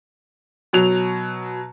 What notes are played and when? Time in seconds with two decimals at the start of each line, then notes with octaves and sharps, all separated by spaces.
0.73 B2 F#3 F7